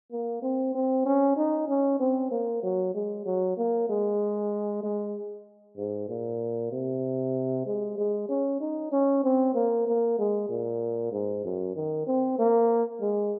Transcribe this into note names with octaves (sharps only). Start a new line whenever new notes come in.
A#3
C4
C4
C#4
D#4
C#4
C4
A#3
F#3
G#3
F#3
A#3
G#3
G#3
G#2
A#2
C3
G#3
G#3
C#4
D#4
C#4
C4
A#3
A#3
G#3
A#2
G#2
F#2
D#3
C4
A#3
G#3